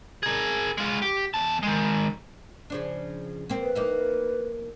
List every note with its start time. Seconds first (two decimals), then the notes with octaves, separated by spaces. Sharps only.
0.23 G#4 A#4
0.78 G#3 F4
1.02 G4
1.34 E2 A5
1.63 D#3 G#3
2.70 C#3 F3 D4
3.50 A#3 C4
3.62 B4
3.75 A#3 D#4 E4